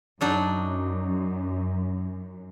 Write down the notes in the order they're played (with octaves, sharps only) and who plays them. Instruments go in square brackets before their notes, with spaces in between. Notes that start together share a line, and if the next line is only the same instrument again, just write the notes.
[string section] F#2 [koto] F#3 D4 D#4